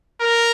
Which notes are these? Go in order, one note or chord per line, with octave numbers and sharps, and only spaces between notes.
A#4